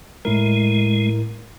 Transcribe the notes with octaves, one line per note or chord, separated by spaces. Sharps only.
A2 G#3 E4 A#4